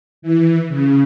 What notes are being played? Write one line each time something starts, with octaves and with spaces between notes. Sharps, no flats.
E3
C#3